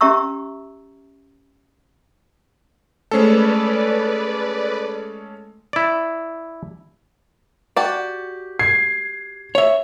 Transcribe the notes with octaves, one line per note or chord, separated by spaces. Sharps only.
C#4 G4 E5 A#5 C#6 E6
G#3 A3 C#4 A4 B4 C5 D5
E4 D5
F#4 G4 D5
G#6 C7
C#5 E5